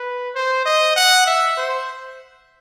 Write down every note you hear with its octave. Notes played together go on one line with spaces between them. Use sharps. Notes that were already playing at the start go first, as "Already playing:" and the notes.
Already playing: B4
C5
D#5
F#5
E5
C5